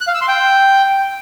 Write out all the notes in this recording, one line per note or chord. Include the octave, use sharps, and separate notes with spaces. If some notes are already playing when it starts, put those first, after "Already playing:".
F#6
F5
E6
C6
G5